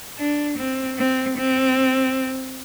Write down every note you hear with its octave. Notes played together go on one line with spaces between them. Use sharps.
D4
C4
C4
C4